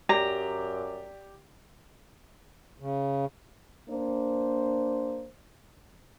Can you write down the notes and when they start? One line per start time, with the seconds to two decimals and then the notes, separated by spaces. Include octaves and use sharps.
0.09 F#2 G4 D5 A#5
2.79 C#3
3.89 A#3 D4 C5